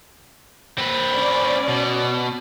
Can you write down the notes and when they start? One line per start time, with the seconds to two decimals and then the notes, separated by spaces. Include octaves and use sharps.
0.78 C4 B4
1.13 C#4 D5
1.68 B2